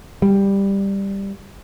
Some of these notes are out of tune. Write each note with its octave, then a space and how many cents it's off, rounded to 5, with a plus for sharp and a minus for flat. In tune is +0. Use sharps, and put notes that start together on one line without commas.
G3 +10